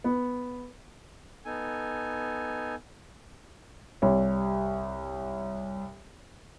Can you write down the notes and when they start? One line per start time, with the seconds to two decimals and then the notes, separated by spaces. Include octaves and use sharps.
0.04 B3
1.45 B3 D#4 A4 G#5
4.02 C2 G3 C#5